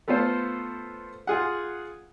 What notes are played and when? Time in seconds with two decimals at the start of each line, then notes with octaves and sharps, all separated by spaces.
0.08 A3 B3 F4 A4 C5
1.27 F4 G#4 F#5